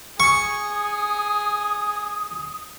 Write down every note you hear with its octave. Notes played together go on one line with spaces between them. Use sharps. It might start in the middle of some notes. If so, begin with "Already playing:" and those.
G#4 C#6 D#6